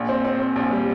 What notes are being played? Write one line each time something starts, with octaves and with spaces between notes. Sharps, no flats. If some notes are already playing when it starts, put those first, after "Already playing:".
Already playing: A#1
C4
C4
C4
A#1
G3